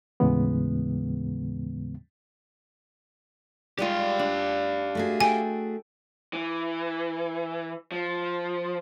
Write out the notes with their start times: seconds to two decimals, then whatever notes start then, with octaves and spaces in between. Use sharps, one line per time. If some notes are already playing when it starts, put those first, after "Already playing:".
0.20 D#2 A2 C#3 E3 G#3 B3
3.78 G3 G#3 F4 G4 F5
4.19 D4
4.95 A3 F#4 G#4
5.20 A4 G5 G#5
6.33 E3
7.92 F3